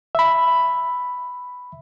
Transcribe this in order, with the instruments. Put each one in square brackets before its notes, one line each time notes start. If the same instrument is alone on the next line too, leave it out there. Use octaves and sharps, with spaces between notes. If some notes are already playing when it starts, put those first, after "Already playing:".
[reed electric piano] E5 B5